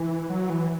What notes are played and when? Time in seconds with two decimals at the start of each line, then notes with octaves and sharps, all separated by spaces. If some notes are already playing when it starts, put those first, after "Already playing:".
Already playing: E3
0.30 F#3
0.50 E3